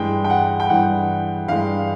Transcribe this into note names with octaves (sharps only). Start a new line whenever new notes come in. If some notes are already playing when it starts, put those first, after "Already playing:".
Already playing: G2 E3 G#3 G5
G5
F#5
G5
G2 E3 G#3 F#5
G2 E3 G#3 F5